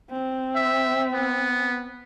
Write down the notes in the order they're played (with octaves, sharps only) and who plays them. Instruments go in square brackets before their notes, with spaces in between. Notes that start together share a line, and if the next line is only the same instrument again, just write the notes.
[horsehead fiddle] C4
[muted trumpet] E5
B3